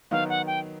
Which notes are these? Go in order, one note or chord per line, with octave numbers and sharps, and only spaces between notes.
D#3 F#3 B3 D#4 F5
F#5
G5